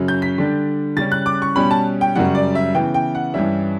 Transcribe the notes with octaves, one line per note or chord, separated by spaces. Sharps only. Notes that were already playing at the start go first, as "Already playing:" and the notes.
Already playing: F#2 C#3 F#3 C#4
G6
B6
D3 G3 D4
C#3 G3 C#4 A6
F#6
D6
C#6
B2 G3 C#4 B5
A5
G5
F#2 C#3 G3 F#5
D5
E5
C#3 E3 B3 G5
G5
F#5
G2 E3 G3 C#4 E5